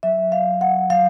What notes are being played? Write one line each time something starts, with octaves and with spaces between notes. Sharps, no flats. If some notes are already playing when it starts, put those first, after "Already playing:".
F#3 E5
F#3 F5
F#3 F#5
F#3 F5